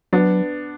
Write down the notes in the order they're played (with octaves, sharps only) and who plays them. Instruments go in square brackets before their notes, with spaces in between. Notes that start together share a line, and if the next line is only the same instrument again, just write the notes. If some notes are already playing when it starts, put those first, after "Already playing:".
[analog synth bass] F#3 [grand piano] B3 D4